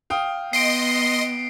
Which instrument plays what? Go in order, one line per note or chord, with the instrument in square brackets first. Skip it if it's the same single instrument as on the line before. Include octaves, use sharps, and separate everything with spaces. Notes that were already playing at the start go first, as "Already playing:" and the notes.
[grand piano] F5 G5 D#6
[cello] B3 [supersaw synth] D#5 C6 [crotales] C7 D7